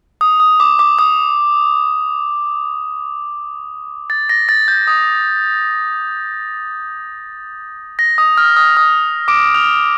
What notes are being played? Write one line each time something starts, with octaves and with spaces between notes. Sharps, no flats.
D#6
D#6
D6
D6
D#6
A6
A#6
A6
G6
D#6
A#6
D#6
F6
D#6
D#6
D6 D7
F6 F7